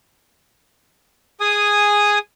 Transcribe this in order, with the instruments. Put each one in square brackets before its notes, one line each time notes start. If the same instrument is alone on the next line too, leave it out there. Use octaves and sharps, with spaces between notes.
[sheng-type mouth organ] G#4 G#5 D#6